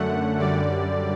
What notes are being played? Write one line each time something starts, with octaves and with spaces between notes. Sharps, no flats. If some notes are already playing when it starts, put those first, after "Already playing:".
Already playing: F#2 D3 A3 F#5
F#2 D3 G3 D5